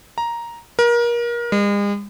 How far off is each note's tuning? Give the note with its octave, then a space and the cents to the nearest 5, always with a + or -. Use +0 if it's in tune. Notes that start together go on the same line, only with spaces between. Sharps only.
A#5 +5
A#4 +30
G#3 -40